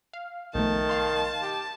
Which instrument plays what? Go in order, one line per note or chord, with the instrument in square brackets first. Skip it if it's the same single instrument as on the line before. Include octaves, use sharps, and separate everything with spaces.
[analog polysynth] F5
[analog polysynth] B1 F3 A3 [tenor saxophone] D#3 [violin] A5
[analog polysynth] F5 C6
[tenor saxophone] G4